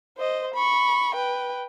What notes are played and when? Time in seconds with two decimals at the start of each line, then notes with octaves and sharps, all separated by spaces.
0.17 C5 D#5
0.54 B5 C#6
1.14 B4 G5